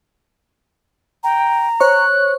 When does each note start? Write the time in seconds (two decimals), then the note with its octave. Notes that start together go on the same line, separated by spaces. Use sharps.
1.23 G5 A#5
1.80 C5 C#5 C#6 F#6